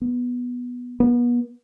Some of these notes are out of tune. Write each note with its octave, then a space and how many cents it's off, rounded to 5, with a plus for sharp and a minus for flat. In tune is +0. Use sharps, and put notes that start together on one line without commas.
B3 -5
B3 -35